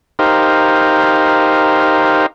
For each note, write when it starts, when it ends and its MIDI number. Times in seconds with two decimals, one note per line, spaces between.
0.19 2.26 63
0.19 2.26 67
0.19 2.26 70
0.19 2.26 72
0.19 2.26 77